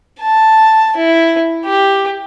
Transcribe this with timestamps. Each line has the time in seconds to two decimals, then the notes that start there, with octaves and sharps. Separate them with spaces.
0.21 A5
0.97 E4
1.66 G4